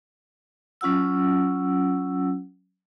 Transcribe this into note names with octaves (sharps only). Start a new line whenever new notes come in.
F#3 C#4 F4 F#5 E6